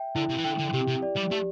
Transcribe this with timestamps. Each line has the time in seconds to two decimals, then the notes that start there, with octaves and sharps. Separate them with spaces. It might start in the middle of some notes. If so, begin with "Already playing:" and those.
Already playing: E5 G5
0.15 D3 E4
0.30 C3
0.37 E3
0.44 D3 G5
0.59 D3
0.74 C3 G4
0.88 C3
1.02 D5
1.16 G3
1.31 A3 G4